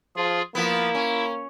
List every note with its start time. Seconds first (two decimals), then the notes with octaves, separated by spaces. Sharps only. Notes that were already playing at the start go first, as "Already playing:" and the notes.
0.16 F3 F4 G#4
0.55 F3 A#3 B3 E4
0.95 C#4